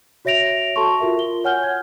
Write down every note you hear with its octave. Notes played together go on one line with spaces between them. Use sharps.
F#4 C#5 E5 A#6 D7 F7
F#4 A4 A5 C6 C#6
F4 F#4 A#4 E5
F4 G7
C#5 F#5 G#5 F6 G6 G7
G#6